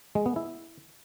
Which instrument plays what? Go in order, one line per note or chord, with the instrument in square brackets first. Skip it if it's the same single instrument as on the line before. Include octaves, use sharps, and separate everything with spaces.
[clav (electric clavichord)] G#3
B3
E4